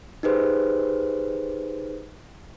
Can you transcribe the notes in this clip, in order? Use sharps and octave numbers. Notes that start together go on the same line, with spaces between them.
D#4 G4 G#4 B4 C5